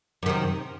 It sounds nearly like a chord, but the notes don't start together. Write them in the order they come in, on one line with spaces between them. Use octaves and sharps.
F#2 D#3 C3